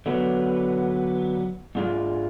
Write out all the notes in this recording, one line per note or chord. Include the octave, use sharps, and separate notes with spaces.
D3 F#3 B3
G#2 G#3 D4 F4